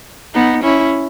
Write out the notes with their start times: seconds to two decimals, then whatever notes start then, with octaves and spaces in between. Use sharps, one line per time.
0.34 B3 D#4
0.63 C#4 E4